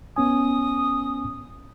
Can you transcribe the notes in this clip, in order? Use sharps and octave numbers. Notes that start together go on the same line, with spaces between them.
B3 C#4 G#5 D#6